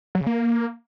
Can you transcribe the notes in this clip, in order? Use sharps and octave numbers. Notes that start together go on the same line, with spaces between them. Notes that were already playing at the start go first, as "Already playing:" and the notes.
F#3
C#3
A#3